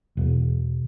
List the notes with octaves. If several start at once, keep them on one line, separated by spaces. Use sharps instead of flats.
E1